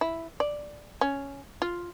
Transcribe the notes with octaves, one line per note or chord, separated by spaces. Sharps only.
E4
D5
C#4
F4